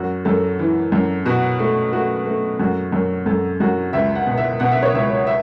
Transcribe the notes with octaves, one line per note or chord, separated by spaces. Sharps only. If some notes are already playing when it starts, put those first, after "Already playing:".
Already playing: F#2 F#4
F#2 A4
E3
F#2
B2 F#4
A3
A3 F#4
A3
F#2 F#4
F#2
F#2 A4
F#2 F#4
C#2 E5
F#5
B2
E5
B2 F#5
E5
C#5
C#2 E5
E5